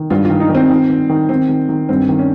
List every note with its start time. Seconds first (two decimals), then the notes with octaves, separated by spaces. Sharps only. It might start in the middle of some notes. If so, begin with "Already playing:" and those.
Already playing: D#3
0.10 G2 F4
0.25 D#3 F4
0.40 D#4
0.49 D#3
0.55 C4
0.70 D#3
0.89 D#3
1.09 D#3
1.29 D#3 C4
1.49 D#3
1.69 D#3
1.89 G2 C4
2.09 D#3
2.19 C#4